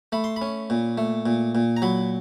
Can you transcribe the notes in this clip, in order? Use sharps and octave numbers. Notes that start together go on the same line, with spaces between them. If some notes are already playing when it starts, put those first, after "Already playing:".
A3 B5
C6
B5
C#4
A#2
A3
A#2
A#2
A#5
F#3 B5